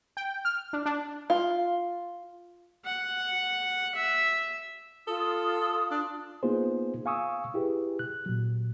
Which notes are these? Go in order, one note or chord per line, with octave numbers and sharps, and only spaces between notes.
G5
F6
D4
D4
F4
F#5
E5
F4 A4 D#6
D4
A#3 B3 D#4 F4 G#4 C5
F5 G#5 C#6 D#6 E6
E4 G4 G#4 B4
F#6
A#2 F#3